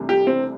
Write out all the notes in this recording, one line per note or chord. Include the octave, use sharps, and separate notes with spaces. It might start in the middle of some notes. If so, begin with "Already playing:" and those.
Already playing: C2 C3 E3 A3 D4
G4
C4